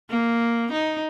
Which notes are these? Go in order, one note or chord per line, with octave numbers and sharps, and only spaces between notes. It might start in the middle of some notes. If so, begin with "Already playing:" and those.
A#3
D#4